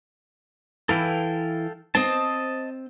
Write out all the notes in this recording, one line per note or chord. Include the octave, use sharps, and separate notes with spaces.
E3 E4 A4 F5 G5 G#5
C4 C5 D#5 A5